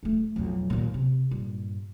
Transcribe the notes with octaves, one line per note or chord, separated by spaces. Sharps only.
D#1 A3
B1 F2
D#2 A#2
C3
G2 A#2